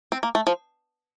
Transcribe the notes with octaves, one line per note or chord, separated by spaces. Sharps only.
C4
A#3
A3
F3